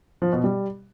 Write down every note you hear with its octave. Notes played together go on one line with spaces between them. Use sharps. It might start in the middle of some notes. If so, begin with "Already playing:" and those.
F3
B2
G3